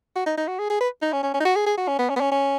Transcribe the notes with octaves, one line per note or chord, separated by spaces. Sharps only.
F#4
D#4
D#4
F#4
G#4
G#4
B4
D#4
C#4
C#4
C#4
D#4
F#4
G#4
G#4
F#4
C#4
B3
C#4
B3
C#4
C#4